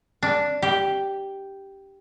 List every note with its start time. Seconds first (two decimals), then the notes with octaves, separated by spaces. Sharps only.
0.23 D4
0.62 G4